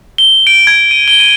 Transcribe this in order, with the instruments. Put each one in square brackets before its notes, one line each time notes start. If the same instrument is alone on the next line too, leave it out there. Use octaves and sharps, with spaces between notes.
[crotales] G7
D7
G#6
D#7
G7
D#7